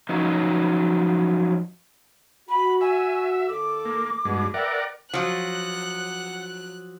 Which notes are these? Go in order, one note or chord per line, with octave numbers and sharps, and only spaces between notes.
F3 F#3 C#4 D#4
F#4 B5
E5 G#5
D#2 A4 D6
A#3
B1 G2 B2 G#3
A#4 B4 D5 E5 F#5 G5
F3 F#3 F#5 F#6